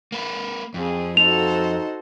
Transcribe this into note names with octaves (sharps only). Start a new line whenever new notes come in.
A#3 B4
F2 C4 G#4
D#4 F#4 A4 C5 F7